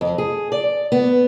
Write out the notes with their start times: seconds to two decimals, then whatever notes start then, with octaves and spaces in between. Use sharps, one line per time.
0.01 F2
0.18 G#4
0.52 D5
0.92 B3